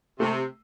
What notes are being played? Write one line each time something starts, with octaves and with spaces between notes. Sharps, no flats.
C3 A3